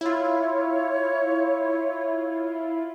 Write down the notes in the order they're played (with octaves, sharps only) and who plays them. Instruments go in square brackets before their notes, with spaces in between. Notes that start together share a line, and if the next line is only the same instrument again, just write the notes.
[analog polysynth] E4 F4 [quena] C#5